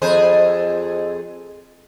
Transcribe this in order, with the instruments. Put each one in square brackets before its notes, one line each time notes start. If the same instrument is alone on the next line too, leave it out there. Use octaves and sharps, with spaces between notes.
[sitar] F2 G#4 C5